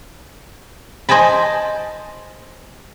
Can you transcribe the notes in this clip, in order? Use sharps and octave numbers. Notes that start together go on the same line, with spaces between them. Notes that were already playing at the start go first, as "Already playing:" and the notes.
C5 D#5 G#5 A5 B5